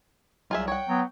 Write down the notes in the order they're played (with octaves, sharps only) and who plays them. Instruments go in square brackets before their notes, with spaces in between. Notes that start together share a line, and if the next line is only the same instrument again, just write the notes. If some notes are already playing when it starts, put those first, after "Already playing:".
[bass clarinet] C2 [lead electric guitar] F#3 [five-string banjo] F4 G#4 E5
[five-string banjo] C#5 F#5 [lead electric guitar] G5
[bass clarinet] F#3 [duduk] B3